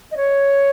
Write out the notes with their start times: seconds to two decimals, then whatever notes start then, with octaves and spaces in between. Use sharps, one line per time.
0.11 D#5
0.17 C#5